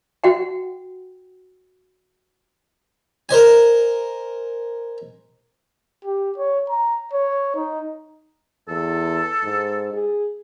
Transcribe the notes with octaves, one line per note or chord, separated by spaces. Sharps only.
F#4 F#5 G5
A#4 C5 D#5 G#5
G4
C#5
A#5
C#5
D#4
E2 A4
G#2
G#4